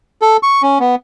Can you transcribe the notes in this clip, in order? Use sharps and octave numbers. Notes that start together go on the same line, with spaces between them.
A4
C#6
C#4
B3